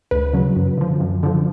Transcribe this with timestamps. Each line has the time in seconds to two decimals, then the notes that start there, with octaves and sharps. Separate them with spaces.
0.11 D2 B4
0.33 C#3 F#3
0.56 F#2
0.78 D3 F3
1.00 F#2
1.23 D3 F3